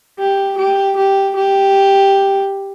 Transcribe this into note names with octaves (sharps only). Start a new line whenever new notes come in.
G4
G4
G4
G4